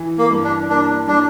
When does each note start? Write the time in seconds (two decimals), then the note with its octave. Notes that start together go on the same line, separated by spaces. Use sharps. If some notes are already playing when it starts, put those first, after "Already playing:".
Already playing: E3
0.18 A#3
0.31 G2
0.44 D4
0.70 A#3 D4
1.08 G3 D4